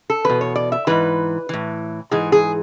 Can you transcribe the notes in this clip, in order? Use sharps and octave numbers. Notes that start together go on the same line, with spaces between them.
A4
E2 B2 B4
C#5
D5
E5
G#2 E3 B4
A2 E3
G#2 E3 G#4
G#4